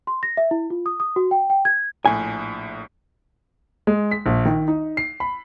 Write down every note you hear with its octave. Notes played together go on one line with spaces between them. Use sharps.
C6
A#6
E5
E4
F4
D#6
D#6
F#4
G5
G5
G#6
A#1 A2 G#5
G#3
B6
A#1
D#3
D#4
C7
B5